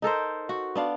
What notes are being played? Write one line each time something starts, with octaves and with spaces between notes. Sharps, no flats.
D#4 A4 A#4 C5
F#4
B3 D4 F5